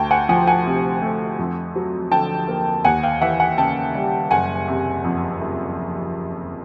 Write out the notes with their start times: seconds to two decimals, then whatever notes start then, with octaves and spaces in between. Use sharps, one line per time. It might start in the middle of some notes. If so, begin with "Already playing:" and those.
Already playing: D2 G5 A5
0.11 F#5 G#5
0.29 F3 F#5 G#5
0.47 F#5 G#5
0.66 C3
1.02 A3
1.39 F2
1.76 F#3
2.12 D3 G5 A5
2.48 A#3
2.85 D#2 F#5 G#5
3.03 F5 G5
3.21 E3 E5 F#5
3.40 F#5 G#5
3.58 C#3 G5 A5
3.95 G3
4.31 F#1 F#5 G#5
4.68 C3
5.04 F2
5.41 F#1